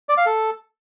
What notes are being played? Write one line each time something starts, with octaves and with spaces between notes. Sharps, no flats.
D5
F5
A4